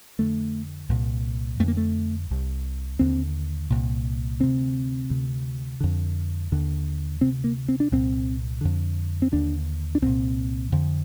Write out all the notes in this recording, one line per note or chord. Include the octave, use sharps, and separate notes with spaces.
F2 D3 A3
C2 A#2
F2 D3 A3 A#3
A3
C2 C3
D#2 D3 C4
C2 A#2
D2 C3 C4
D2 C3
F2 D3
D#2 D3
D2 C3 C4
A#3
C4
D4
C2 A#2 C4
F2 D3
C4
D#2 D3 D4
D4
C2 A#2 C4
F2 D3